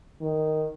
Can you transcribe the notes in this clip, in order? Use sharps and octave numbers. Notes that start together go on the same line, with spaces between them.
D#3